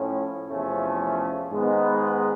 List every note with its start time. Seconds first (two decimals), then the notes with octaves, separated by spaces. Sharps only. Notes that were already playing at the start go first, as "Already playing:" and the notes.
Already playing: A2 F3 A3 C#4
0.49 E2 C3 F3 A3 C#4
1.51 G#2 D#3 G#3 B3 D#4